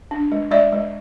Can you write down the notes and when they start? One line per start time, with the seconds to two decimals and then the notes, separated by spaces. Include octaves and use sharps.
0.11 D4
0.32 G#3
0.51 G#3 D5 E5
0.72 G#3